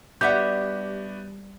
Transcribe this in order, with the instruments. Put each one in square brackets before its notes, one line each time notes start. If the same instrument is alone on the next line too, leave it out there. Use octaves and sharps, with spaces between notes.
[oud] G3 [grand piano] B3 D4 F#4 [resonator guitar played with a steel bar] G4 E5 F#5 [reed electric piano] G6